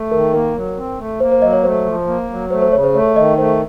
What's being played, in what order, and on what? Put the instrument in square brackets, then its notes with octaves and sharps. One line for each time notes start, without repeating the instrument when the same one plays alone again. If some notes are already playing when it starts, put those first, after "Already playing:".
Already playing: [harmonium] A3
[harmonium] D#3 [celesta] A#4
[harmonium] A#3 [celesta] A#4
[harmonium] F#3
C4
A3
[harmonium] A#3 [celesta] C5
[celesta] C5
[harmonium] F#3 [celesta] D#5
[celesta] C#5
[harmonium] A3 [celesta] C5
[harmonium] F3
A#3
F#3
[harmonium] A3 [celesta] C5
[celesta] C5
[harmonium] C#3 [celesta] C#5
[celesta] C5
[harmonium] A3 [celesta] C#5
[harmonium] D#3 [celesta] D#5
[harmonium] A3 [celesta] C5